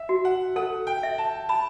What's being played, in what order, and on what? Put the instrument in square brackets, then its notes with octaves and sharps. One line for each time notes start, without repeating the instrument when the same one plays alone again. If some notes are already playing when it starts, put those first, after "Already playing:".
Already playing: [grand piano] E5
[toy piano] F#4
[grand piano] F#5
[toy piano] A4 [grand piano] F#5
[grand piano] G5
[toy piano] E5
[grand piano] A5
[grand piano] A5 [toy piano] B5